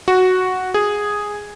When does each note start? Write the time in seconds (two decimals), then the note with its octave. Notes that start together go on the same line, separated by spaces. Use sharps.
0.08 F#4
0.74 G#4